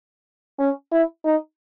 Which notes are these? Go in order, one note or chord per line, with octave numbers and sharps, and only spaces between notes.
C#4
E4
D#4